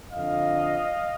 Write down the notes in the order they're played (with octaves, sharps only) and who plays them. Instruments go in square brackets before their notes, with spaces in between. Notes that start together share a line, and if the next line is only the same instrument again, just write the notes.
[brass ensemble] F2 D3 D#5 F5